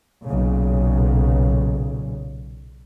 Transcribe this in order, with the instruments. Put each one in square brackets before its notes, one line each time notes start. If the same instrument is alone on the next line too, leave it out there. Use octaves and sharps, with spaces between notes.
[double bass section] B1 A#2 C#3